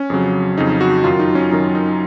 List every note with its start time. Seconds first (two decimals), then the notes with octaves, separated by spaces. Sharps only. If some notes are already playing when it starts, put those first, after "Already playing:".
Already playing: C#4
0.10 F2 C#3 F#3
0.58 F2 C#3 F#3 D#4
0.81 F#4
1.04 F#2 D#3 F#3 F4
1.20 D#4
1.35 C#4
1.51 F#2 D#3 F#3 D#4
1.75 D#4